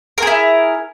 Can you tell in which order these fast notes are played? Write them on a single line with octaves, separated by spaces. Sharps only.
A#4 G#4 E4